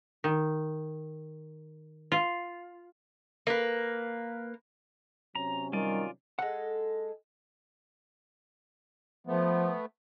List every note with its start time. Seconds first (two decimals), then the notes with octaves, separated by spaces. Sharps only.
0.24 D#3
2.12 F4
3.47 A#3 B4
5.35 C3 F#3 C#4 A#5
5.73 D#3 G3 F4 D5 G#5
6.39 G#3 A4 F#5
9.27 F3 A3 B3